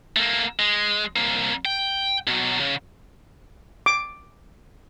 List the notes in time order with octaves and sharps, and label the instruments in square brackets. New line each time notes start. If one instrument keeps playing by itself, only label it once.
[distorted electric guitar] A3 A#3
G#3
C2 A#3
G5
B2 F#3
C#3
[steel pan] D6